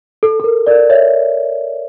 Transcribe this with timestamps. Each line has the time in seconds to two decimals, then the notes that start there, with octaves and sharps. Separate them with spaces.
0.23 A4
0.40 A4
0.44 A#4
0.67 A#4 D5
0.90 C#5 E5